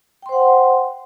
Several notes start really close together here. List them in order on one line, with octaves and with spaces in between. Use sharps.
G5 C6 C5 F#5